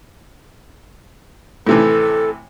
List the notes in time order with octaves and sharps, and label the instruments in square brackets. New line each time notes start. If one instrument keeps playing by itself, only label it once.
[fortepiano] A2 C3 E3 [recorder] A4